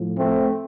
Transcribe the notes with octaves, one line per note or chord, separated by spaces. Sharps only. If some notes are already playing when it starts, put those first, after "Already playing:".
Already playing: A2 F3
A3 C4